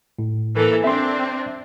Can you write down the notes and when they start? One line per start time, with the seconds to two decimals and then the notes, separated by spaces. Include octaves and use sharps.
0.19 A2
0.55 E3 A#3 A4
0.84 C4 D4 E5 C6